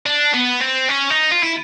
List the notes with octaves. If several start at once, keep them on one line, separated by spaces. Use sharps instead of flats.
D4
B3
C4
C#4
D#4
F4
E4